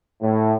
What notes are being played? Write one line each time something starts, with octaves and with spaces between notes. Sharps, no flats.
A2